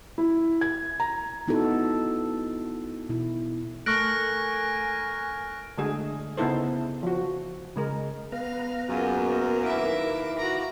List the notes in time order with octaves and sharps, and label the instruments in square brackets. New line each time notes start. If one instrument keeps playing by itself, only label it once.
[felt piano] E4
G#6
A#5
[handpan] B3 D#4 E4 F#4 A4
B2 E4
[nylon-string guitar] A3 [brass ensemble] A#4 G#5 [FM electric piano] C#6 F#6 [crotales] F6 A#6 D7
[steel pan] D3 G#3 A3 G#4
C#3 B3 D#4 E4 A4 C5
F3 F#4
C#3 G#3 A#4
[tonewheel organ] B3 B4 A#5 [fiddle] F5
[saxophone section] F#2 [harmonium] A#3 G#4 [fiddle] F4
[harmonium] D#2 B4 F5 [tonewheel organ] E4 D6 [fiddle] A#4 E5
[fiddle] F#4 A#5